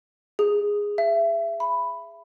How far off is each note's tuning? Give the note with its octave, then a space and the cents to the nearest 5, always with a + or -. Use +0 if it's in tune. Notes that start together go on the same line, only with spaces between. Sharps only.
G#4 -10
E5 +25
B5 +5